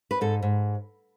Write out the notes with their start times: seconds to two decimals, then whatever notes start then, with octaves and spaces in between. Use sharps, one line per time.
0.11 B4
0.21 G#2 A4
0.42 G#2